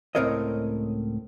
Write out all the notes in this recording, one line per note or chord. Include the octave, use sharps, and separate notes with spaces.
C#2 A2 C4 A#4 C#5 D#5